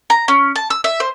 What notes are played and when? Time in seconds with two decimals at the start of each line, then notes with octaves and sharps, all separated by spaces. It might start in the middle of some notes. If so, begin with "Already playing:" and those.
0.10 A#5
0.28 C#4
0.56 A5
0.70 E6
0.84 E5
1.00 C5